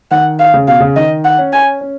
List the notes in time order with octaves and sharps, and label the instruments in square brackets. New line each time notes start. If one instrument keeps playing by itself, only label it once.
[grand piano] D#3 [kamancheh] F#5
[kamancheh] F5
[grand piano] C#3
[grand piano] B2 [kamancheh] F5
[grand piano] C#3
[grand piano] D#3 [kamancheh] D#5
[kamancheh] F#5
[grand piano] C#4
[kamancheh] G#5
[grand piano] C#4